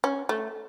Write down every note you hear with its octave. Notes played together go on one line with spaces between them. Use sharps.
C#4
A3